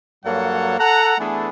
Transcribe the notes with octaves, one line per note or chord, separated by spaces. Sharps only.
G2 F#3 A#3 A4 C#5 F#5
A4 F#5 A#5
E3 A3 B3 D4 G#4 A4